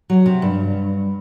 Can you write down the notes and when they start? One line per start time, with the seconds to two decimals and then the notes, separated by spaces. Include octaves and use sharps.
0.10 F#3
0.26 C3
0.42 G2